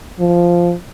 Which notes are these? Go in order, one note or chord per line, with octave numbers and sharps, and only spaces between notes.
F3